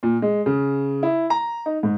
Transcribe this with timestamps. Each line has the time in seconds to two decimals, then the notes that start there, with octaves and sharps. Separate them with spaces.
0.03 A#2
0.22 G#3
0.46 C#3
1.03 E4
1.30 A#5
1.66 D#4
1.83 G#2